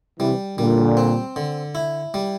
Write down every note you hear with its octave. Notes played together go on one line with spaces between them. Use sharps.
C3 E3 G3
A#2 D3 G3
C4
D3
E4
G3